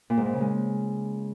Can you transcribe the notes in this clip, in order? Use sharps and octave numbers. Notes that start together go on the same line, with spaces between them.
A#2
G#2
A#2
C#3
G#3